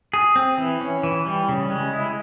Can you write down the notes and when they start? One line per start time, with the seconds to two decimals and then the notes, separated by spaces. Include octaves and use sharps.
0.13 G#4
0.36 C4
0.58 E3
0.81 C#4
1.03 E3
1.26 G3
1.49 C#3
1.70 G#3
1.93 E4